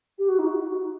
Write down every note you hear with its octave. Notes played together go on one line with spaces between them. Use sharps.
G4
F#4
D#4
F#4